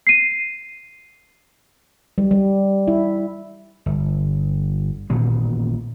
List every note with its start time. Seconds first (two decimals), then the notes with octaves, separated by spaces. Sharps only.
0.07 C7 D#7
2.18 G3
2.31 G3
2.88 E4
3.86 G1
5.10 A1 A#2 D#3 B3